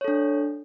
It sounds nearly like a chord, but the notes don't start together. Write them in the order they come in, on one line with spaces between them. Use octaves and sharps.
C#5 A4 D4